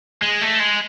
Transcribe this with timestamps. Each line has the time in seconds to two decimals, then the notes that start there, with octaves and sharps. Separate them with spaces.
0.22 G#3
0.41 A3
0.59 G#3